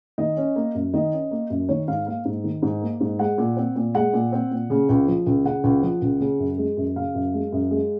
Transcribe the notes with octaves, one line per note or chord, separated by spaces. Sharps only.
D#3 D#5
C#4
A#3
F#2
D#3 D#5
C#4
A#3
F#2
D#3 C#5
G#2 F5
A#3 F5
G#2
D#3
G#2
A#3
G#2
G#3 F#5
A#2
C4
A#2
G#3 F#5
A#2
C4
A#2
C#3
C#2
F3
C#2
C#3 F#5
C#2
F3
C#2
C#3
F#2
G#3
F#2
C#3 F5
F#2
G#3
F#2
G#3